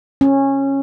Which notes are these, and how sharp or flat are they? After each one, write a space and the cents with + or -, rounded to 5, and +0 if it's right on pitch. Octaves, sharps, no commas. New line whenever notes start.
C#4 -15